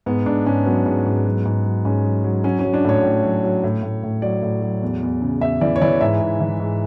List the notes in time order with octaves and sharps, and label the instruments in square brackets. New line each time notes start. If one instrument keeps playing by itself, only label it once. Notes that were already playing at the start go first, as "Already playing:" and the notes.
[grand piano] G#2 B3
G#2 D4
G#2 C#4
F#3 B3
G#2
G#2
F#3
G#2
F#3
G#2 C#4
F#3
F#3
F#3 C#4
C#4
F#3
D4
A2 C#5
A2
F#3
F#3
A2
A2
A2
F#3 D5
A2
F#3
E2
E2
C#3
E2 E5
E3 D5
C#5
E3 D5
G#2 E5
G#2
E3
G#2